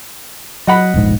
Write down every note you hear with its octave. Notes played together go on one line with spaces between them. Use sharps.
F#3 D#5 F#5 B5
E1 A#1 G#2